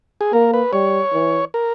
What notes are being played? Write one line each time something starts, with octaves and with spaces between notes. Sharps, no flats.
G#4
A#3 A#4
B4
G3 C#5
E3
A#4